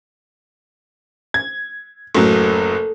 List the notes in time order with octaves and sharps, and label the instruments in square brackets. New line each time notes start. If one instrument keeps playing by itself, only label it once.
[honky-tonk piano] G#6
[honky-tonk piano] F#1 A2 F#3 [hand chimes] A4